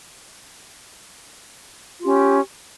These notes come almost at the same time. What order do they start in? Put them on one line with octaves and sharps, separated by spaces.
F4 G4 C#4